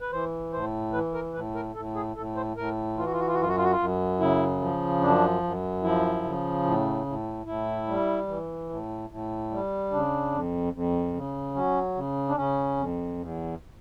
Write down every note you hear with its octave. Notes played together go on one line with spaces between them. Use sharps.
B4
E3 C5
A2 C5
E3 B4
A#4
A2 B4
A#4
A2 A4
G#4
A2 A4
C5
A2 A#4
E3 F4
F#4
F4
F#4
F4
F#4
F#2 F4
F#4
F4
F#4
F4
F#2
C#3 E4
F3
F#2 D4
F#2
F3 E4
C#3
A2
A2
A2 E4
G3
E3
A2
A2
G3
C#3 D4
F2
F2
C#3
F#3 C#4
C#3
D4
C#3 C#4
F2
E2